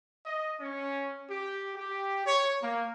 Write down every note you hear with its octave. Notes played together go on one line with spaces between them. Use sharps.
D#5
C#4
G4
G4
C#5
A#3